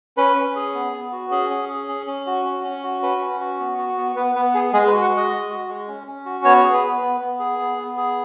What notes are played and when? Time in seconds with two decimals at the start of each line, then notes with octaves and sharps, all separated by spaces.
0.17 C#4 B4
0.36 C#4
0.55 G#4
0.74 B3
0.93 B3
1.12 F#4
1.31 C#4 G#4
1.50 C#4
1.69 G#4
1.88 C#4
2.07 C#4
2.26 F#4
2.45 C#4
2.64 C#4
2.83 F#4
3.02 C#4 B4
3.21 C#4
3.40 F#4
3.59 B3
3.78 F#4
3.97 B3
4.16 B3 B4
4.35 B3 B4
4.55 G#4
4.73 G#3 G#4
4.87 B4
4.92 F#4
5.02 F#5
5.11 G#3
5.16 D#5
5.31 G#3
5.50 F#4
5.68 G#3
5.88 C#4
6.07 C#4
6.25 F#4
6.44 B3 C#5
6.64 G#4
6.73 B4
6.83 B3
7.02 B3
7.21 B3
7.39 G#4
7.59 B3
7.78 B3
7.97 G#4